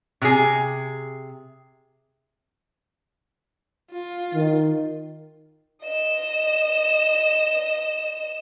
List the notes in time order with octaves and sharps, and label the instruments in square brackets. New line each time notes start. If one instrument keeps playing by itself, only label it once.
[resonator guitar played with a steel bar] C3 G#4
[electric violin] F4
[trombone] D#3
[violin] D#5 E7